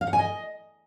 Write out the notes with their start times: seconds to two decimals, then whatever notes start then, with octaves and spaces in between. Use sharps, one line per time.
0.01 F5
0.07 F#5
0.13 G#5
0.19 D#5